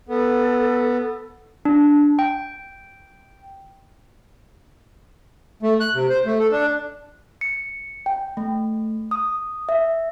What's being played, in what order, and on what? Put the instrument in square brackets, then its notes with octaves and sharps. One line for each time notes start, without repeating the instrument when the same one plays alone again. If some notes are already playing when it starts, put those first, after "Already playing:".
[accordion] B3 [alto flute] A4
[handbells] D4
G5
[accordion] A3
F#6
C3
C5
A3
A4
D4
[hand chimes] C#7
G5
A3
D#6
E5